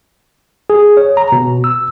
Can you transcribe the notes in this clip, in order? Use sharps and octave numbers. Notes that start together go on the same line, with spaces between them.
G#4
C#5
A#5
B2
E6